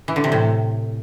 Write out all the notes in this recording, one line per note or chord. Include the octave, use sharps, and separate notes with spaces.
E3
D3
C3
A2